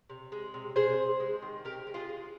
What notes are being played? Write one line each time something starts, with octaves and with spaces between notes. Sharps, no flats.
C3
G#3
C3
C3 G#4 C5
C3
G#3
D#3
C3 G4 A#4
G#3
F4 G#4
G#3